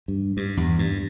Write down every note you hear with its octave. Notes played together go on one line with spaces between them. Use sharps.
G2
G2
E2
G2